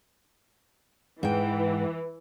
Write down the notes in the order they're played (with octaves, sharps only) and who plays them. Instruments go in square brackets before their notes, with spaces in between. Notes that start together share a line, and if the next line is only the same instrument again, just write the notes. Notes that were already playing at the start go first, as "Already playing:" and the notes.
[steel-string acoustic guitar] G#2 G5 [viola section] E3